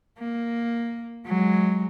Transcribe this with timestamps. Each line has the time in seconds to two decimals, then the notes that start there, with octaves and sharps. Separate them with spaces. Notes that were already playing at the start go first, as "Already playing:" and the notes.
0.19 A#3
1.27 F#3 G#3